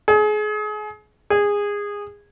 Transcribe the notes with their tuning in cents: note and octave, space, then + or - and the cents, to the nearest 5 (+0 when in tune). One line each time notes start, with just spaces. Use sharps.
G#4 +30
G#4 -20